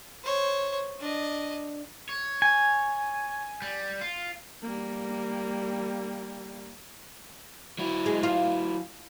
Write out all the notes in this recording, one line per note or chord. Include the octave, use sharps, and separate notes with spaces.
C5 C#5
D4 D#5
C#5
G#5
G3
F4
G3 A#3
F#3 E4
G#3
F4